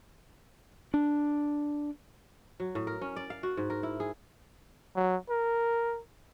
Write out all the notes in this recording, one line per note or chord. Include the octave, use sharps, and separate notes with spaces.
D4
F#3
A2
A#4
C#4
D5
F5
F#4
G#2
A#4
E4
G#4
F#3
A#4